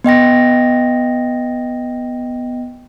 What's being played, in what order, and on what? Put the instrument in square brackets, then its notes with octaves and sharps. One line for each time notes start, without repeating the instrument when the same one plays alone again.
[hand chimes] B3 D#5 G5 A#6